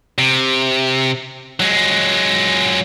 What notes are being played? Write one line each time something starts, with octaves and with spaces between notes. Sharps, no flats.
C3
F#3 G#3